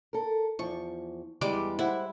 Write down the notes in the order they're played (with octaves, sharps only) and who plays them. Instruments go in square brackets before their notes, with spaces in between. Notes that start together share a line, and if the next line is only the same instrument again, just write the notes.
[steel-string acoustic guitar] A4 A#4
[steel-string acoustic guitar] E2 F3 [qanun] C#6
[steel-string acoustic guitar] E2 E3 [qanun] G3 G#3 D6
[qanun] E4 [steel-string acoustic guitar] C5 F#5